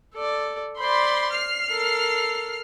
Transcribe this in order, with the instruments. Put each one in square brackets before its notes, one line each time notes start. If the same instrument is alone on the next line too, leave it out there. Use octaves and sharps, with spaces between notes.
[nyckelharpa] A4 D5
[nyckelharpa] C5 D5 [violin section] B5 C6
[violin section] F6 C7
[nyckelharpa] A4 A#4